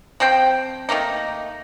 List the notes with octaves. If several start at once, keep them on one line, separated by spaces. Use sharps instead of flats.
F3 C4 C5 G5
D#3 A3 A#3 D#4